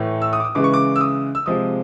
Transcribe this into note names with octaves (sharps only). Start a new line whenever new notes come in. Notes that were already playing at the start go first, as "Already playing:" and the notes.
Already playing: A2 E3 A3
E6
D#6
D6
D#6
C#3 E3 G#3 D6
C#6
D6
E6
D#6
E6
C3 F3 G#3 D#6